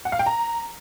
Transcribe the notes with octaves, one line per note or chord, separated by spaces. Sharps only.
F#5
F5
G5
A#5